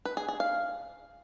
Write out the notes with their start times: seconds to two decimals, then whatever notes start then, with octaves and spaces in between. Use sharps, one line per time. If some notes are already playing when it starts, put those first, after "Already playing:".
0.05 B4
0.17 G#4
0.28 G#4
0.40 F5